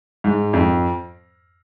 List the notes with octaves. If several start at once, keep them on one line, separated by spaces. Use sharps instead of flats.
G#2
F2